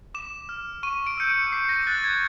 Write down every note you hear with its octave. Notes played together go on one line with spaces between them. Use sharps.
D6 E7
F6
C#6 D#7
D7
E6 G6 C#7
D7
D6 C7
A#6
F#6 A6
G#6